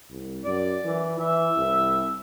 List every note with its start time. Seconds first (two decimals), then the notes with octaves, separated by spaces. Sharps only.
0.11 C2
0.44 F#2 D5
0.84 E3
1.19 E3 E5
1.57 C2